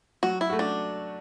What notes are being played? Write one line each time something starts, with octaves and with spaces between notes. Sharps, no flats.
F#3 F#4
E4
A3 F#4
D4